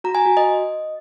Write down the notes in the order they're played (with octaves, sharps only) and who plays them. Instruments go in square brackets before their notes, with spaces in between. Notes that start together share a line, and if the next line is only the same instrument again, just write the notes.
[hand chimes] F#4 A#5
G#5
F#4
D#5